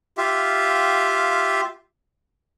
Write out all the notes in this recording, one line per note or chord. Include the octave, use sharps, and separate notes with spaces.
F4 G4 E5 F5